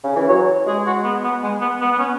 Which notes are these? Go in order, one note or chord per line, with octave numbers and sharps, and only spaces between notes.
C#3
E3
F#3 C#5
G#3 G#4
F#4
B3
B3
G#3
B3
B3
B3
C#4